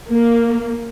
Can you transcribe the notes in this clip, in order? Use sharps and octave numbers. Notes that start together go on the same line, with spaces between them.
A#3